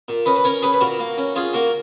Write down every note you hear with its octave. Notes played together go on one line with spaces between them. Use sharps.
A#2
C#4 B4 D#5
B4
C#4 A#4 C#5
C#4 G#4 B4
B4
A#2 F#4 A#4
A#3
C#4
C#4 F4 G#4
A#3 F#4 A#4